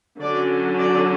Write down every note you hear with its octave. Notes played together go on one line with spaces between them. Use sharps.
D3 F#3 C#4 D5
D5